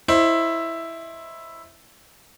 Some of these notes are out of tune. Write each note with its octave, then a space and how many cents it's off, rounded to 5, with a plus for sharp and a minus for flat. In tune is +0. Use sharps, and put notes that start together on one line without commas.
E4 +0 C5 +25 D#5 +5